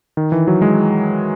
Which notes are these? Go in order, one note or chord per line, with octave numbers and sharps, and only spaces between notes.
D#3
E3
F#3
G#3